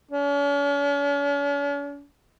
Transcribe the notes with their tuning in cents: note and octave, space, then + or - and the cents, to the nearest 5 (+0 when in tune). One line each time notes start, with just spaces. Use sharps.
C#4 +45